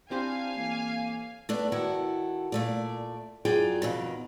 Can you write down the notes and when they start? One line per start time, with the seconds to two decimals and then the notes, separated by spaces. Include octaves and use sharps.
0.11 C4 D4 E4 G4 C5 F5 G#5
0.56 A2 E3 A#3
1.49 A3 B3 D4 D5
1.72 D#3 E4 F#4 G4 A4
2.52 A#2 A3 D5
3.45 F#2 F#3 F4 G#4 D5 G5
3.82 F2 B2 D#3